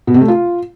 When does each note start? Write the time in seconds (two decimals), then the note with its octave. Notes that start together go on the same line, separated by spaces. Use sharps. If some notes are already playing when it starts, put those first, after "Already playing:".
0.07 B2
0.14 C3
0.21 A3
0.28 F4